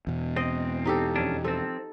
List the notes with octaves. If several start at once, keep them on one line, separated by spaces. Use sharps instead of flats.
E2 B2
C4 D#5
D#4 G4 A4
F2 C#4 D4
F3 C4 A4